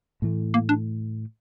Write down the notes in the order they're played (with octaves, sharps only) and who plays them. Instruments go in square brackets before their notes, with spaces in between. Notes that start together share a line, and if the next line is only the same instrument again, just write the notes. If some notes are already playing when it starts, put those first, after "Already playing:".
[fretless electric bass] A2 E3 A3
[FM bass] A#3
D4